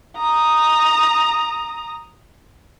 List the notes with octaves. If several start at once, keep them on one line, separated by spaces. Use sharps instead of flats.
A#5 D#6